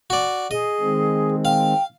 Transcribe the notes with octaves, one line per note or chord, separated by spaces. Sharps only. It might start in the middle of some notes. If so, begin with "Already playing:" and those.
F#4 D5
G#4 D#5
D#3 G#3 C4
F5 G5